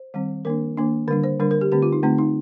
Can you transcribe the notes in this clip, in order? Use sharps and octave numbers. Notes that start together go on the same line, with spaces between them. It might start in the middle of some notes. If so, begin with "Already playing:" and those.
Already playing: C5
D#3 G3 C4
D#3 A#3 D4 A#4
D#3 A#3 D4
D3 G3 D4 A#4
C5
D3 G3 D4 A#4
A#4
G4
D3 A3 C4 G4
F4
D#4
D3 A3 C4 D#4
D#4